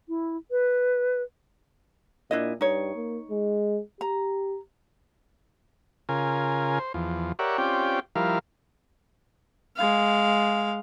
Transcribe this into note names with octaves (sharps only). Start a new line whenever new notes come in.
E4
B4
A#2 D4 E4 D#5
G2 D#4 C#5
A#3
G#3
G4 A#5
C#3 F4 A#4 G#5
C5
E2 F3
G4 A#4 C#5 D5 E5 F#5
C4 C#4 F4 G4 D5 G5
F3 G3 E4 A#4 F5
G#3 F5